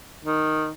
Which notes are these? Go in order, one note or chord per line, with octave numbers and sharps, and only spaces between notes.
D#3